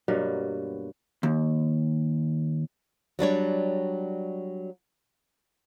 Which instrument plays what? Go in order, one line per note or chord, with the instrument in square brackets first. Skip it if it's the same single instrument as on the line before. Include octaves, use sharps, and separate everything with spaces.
[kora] G2 B2 F#3 A#3
[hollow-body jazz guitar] D#2
[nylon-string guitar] F#3 G3 D4 C#5